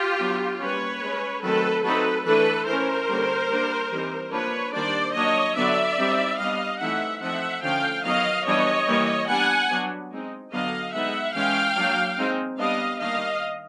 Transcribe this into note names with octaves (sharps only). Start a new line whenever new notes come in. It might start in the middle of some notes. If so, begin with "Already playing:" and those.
Already playing: F4 G4
F#3 B3 D4
G3 A#3 C#4 B4 C#5
G#3 C#4
D#3 F#3 A3 C4 A4 B4
F#3 A3 C4 D#4 A4 B4
E3 A3 D4 A4 B4
E3 A3 C#4 A#4 C5
D3 G3 A#3 C#4
G3 A#3 D4
E3 G3 C4 D#4
F3 A#3 D4 B4 C#5
D#3 G3 A#3 D4 C5 D5
F#3 A#3 D4 C#5 D#5
D3 F#3 B3 D4 D5 E5
G3 C4 D#4
G3 B3 D4 D#5 F5
E3 A3 C4 D#4 E5 F#5
F3 A3 C4 D#4 E5 F#5
D3 F3 A3 C#4 F5 G5
D#3 F#3 B3 D#5 F5
E3 G3 B3 D4 C#5 D#5
E3 G3 A#3
G3 B3 D4 F#5 G#5
F#3 B3 D4
G#3 C4 D#4
D3 F#3 B3 D4 D#5 F5
G#3 B3 D#4 E5 F#5
E3 G#3 C#4 F5 G5
F#3 A#3 D4
G#3 C4 D#4
G3 B3 D4 D#5 F5
D#3 G3 A#3 D4 D#5 F5